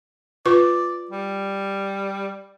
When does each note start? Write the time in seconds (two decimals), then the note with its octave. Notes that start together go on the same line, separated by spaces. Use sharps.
0.46 F4 B4 D5 C#6
1.11 G3